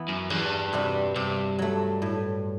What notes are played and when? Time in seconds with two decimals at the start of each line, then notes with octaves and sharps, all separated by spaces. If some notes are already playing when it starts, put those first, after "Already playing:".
Already playing: E3 B3
0.08 F#2
0.30 E2 G2
0.73 C3 G3 B3 F#4
1.15 G2 C3
1.59 F#3 A3
2.02 A2